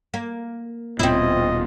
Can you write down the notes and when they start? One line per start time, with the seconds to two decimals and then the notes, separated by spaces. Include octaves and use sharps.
0.14 A#3
0.99 D#1 B2 C4 E4 F4 D#5